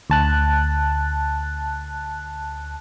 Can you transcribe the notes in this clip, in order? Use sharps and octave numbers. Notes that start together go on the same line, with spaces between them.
D2 A5 F#6